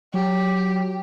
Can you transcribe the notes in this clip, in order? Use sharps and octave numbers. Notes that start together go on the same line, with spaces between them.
F#3 G4